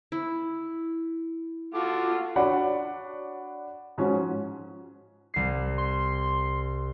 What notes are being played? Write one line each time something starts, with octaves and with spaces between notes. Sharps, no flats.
E4
F4 F#4 A4 D6
D4 F#4 C#5 D5 F#5 B5
G#2 F3 C#4 F#4
C2 C7
C6